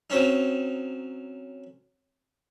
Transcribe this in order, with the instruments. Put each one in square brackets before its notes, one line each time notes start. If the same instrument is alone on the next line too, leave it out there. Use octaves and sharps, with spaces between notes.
[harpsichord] F#3 C4 C#4 D#4